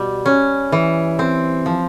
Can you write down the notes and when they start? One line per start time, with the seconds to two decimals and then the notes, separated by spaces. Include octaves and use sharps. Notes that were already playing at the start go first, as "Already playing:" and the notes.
Already playing: B2 G3
0.26 C#4
0.72 E3
1.19 C4
1.66 F3